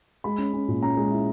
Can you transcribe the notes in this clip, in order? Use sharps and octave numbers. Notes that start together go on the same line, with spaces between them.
G#3 B5
C#4
C#4
A#2
C#4 A#5
G#3
E4